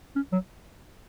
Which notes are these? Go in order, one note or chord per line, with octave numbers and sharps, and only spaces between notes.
C#4
F#3